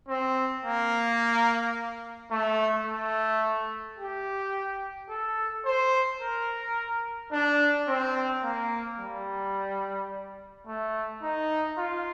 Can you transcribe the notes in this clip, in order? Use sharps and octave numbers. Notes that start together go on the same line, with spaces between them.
C4
A#3
A3
A3
G4
A4
C5
A#4
D4
C4
A#3
G3
A3
D#4
F4